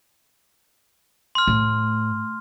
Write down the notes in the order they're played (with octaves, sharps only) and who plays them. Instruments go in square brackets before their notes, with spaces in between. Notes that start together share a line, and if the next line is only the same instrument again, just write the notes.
[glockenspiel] C6 F6
[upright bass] A2